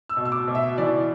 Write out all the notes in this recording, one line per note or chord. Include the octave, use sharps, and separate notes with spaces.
E6
B2
E6
D6
B2
E5
E3 D5